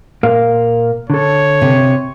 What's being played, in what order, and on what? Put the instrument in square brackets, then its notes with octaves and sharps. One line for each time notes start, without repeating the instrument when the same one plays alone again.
[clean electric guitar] A#2 A#4 F5
[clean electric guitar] D3 A4 [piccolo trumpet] C#5
[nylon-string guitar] C3